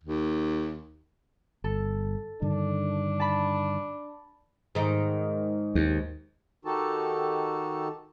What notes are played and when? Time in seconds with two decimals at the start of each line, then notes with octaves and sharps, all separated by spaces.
0.04 D#2
1.64 G1 A4
2.42 G2 D3 D#3 D4
3.20 A5 B5
4.75 G#2 D#3
5.75 D#2
6.65 D#3 D#4 F#4 G4 A4 A5